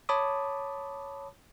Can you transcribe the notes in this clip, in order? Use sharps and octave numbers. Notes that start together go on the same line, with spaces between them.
C#5 A5 B5 D6 D#6